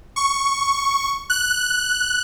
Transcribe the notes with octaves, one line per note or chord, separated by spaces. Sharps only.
C#6
F#6